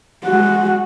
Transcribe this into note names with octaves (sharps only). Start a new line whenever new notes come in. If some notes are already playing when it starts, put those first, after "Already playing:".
G#3 F#4